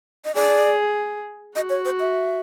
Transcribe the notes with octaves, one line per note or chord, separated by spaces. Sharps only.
D#5
G#4 D5
F#4 D#5
C#5
C5
E5